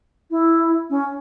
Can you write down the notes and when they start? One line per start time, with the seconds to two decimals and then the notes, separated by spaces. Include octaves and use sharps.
0.31 E4
0.90 C#4